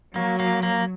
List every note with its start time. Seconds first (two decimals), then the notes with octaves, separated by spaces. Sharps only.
0.16 F#3 A#3
0.40 A#3
0.63 A#3